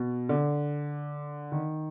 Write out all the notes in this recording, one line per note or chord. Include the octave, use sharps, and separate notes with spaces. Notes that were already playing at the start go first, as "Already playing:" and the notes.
Already playing: B2
D3
D#3